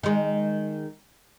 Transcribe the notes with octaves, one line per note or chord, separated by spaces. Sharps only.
D#3 G#3